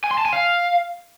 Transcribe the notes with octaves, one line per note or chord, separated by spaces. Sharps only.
G#5
C6
A5
G#5
F5